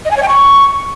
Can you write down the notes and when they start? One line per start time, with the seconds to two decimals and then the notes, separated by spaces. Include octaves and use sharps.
0.05 D#5
0.11 G#5
0.17 C#5
0.22 G5
0.28 C#6